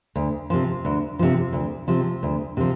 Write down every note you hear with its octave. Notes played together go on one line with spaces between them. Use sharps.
D2
C3 F3
D2
C3 F3
D2
C3 F3
D2
C3 F3